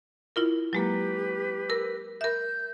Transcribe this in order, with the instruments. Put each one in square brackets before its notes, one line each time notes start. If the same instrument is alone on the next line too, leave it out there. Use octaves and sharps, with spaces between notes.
[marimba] E4 F4 A#4
[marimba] F#3 G#3 A#3 [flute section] G4 B4
[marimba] A#4 E6
[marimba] A#4 E5 [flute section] G6